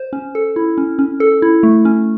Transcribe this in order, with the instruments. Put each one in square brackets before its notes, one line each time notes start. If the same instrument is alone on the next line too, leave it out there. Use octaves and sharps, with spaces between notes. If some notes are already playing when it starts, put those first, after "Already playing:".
Already playing: [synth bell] C5
C#4
A4
E4
C#4
C#4
A4
E4
A3
C#4